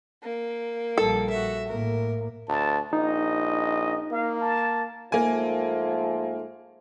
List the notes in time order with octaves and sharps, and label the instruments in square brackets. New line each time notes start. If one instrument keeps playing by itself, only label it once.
[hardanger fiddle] A#3
[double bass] A#1 G3 [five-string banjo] A4
[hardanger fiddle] F#4 E5
[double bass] A2 A#3 [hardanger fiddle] A#4
[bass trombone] D2 [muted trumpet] A5
[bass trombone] A#1 [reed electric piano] D#4 [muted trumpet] D#5
[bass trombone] A#3 [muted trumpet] F5
[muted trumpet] A5
[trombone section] G#2 F3 A3 [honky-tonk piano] A#3 G#5